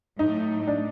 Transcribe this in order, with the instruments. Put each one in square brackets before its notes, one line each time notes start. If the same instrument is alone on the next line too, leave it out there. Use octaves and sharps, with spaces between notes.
[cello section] A2 F#3 A3 [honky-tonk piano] D#4
[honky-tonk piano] D4